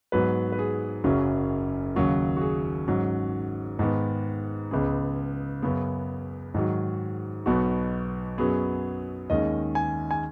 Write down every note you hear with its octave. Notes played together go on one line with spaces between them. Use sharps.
G#2 F#3 B3 B4
B4
G#4
F#1 F#2 C#3 F#3 C#4
D#2 C#3 F#3 F#4
F#4
G#4
G#2 F#3 C#4
G#2 D#3 B3
C#2 C#3 B3 G#4
F#2 C#3 B3
G#2 D#3 F#3
B1 B2 B3 F#4
F#2 F#3 B3 G#4
D#2 D#3 G#3 C#4 D#5
G#5
G#5